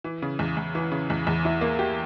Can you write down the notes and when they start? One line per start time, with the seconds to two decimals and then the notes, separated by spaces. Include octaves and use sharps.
0.04 E3
0.22 C#3
0.39 E2
0.57 E2
0.75 E3
0.91 C#3
1.10 E2
1.27 E2
1.45 E4
1.61 A#3
1.79 G4